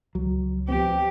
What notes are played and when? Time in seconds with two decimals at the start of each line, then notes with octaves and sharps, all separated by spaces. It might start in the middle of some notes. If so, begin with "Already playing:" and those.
0.15 C#2 F#3
0.68 F3 B3 C4 G4